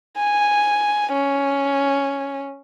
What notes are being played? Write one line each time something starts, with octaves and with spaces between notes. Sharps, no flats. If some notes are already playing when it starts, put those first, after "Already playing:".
G#5
C#4